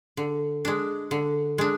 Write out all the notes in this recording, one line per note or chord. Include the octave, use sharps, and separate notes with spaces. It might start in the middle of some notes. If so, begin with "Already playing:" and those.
D3
G#3 D4
D3
G#3 D4